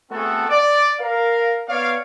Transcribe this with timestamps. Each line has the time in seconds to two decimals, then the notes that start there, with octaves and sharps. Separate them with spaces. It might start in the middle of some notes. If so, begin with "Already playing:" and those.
0.11 A3 B3 C4 F#4 G#4 A4
0.50 D5
1.01 A#4 F5
1.69 B3 C#5 D5 F5